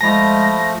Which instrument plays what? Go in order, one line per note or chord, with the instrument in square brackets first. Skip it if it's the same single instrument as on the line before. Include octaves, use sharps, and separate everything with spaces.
[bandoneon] F3 A3 [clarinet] G#3 [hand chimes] A5 B5 [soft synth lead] A#6